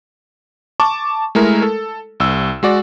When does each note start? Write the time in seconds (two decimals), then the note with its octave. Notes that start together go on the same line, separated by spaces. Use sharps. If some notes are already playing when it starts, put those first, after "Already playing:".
0.80 A5 C#6 D6
1.35 G#3 A3 E4 A#4
1.62 A4
2.20 C2 E6
2.63 G#3 F#4 D5